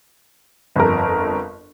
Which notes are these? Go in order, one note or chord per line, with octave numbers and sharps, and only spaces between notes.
G1 F2 A#4